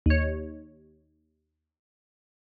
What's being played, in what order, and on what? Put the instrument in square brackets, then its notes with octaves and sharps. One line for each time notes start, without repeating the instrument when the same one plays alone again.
[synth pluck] D#2 C#5